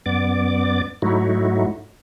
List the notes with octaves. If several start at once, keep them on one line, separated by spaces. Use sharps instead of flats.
F#2 B3 D5 D6
G#2 F#3 A3 D#4 E4 F#4